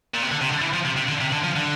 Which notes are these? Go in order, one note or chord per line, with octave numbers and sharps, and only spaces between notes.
A#2
C3
D3
C3
D3
E3
F3
C3
C3
D3
C3
D3
F3
D3